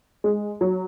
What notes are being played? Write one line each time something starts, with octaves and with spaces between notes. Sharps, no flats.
G#3
F#3